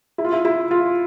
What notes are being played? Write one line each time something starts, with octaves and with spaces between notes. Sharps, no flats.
E4
F4
E4
E4
F4